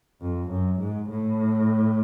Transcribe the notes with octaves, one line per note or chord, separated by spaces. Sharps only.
F2
F#2
G#2
A2